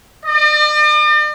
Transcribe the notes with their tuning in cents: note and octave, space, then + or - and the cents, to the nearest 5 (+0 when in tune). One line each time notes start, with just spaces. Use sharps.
D5 +45